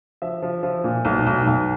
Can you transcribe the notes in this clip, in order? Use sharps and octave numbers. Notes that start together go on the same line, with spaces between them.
F3 E5
F3
F3
A#2
B1
B1
B1